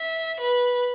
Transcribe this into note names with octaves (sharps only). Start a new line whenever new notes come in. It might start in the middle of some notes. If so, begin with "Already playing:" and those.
Already playing: E5
B4